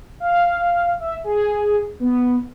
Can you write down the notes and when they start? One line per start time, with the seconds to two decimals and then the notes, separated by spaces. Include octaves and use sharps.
0.20 F5
0.99 E5
1.24 G#4
2.00 B3